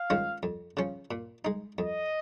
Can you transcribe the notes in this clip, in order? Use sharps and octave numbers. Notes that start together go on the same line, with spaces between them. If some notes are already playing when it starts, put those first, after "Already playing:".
Already playing: F5
D#3 G#3 C#4 F4
F2
C#3 F3 C#4
A#2
G#3 D#4
F2 D#5